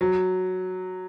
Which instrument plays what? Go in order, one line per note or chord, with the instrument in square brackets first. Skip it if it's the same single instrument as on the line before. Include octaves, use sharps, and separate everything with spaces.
[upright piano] F#3